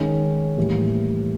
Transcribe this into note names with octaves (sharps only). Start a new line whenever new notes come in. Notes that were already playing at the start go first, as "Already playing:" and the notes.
Already playing: D#3 G#3 C#4
A2 E3 G3 A#3